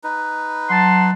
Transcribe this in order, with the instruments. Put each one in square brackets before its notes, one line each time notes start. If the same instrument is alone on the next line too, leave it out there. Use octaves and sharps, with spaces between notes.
[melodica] D#4 B4
[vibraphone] F#3 [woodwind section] F#5 A5 C6